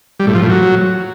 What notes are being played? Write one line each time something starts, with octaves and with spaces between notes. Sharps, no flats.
G3
A2
F3
A2
F#3